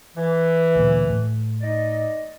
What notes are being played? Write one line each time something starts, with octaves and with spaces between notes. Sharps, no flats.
E3
D2 A#2
A2
D#4 D5 D#5